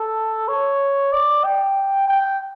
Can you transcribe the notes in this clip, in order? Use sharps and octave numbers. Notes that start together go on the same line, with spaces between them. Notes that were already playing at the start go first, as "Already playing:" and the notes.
Already playing: A4
C#5
D5
G5
G5